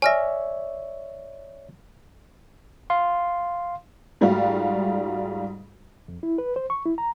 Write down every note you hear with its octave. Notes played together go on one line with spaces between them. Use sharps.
C#5 D5 E5 G#5 F6 A#6
F5 C6
G#2 G3 A3 F4 F#4
F2
E4
B4
C5
C#6
E4
A#5